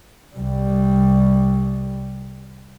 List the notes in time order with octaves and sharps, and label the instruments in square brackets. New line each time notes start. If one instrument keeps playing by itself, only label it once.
[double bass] C2 G3